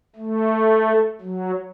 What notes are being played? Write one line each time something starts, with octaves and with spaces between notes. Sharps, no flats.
A3
F#3